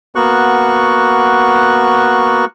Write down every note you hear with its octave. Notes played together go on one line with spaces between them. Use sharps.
A#3 B3 F#4 C#6 F#6